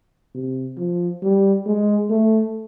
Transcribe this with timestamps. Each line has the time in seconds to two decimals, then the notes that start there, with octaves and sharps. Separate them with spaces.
0.34 C3
0.77 F3
1.22 G3
1.66 G#3
2.10 A3